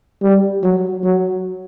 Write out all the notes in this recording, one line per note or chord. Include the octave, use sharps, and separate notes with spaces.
G3
F#3
F#3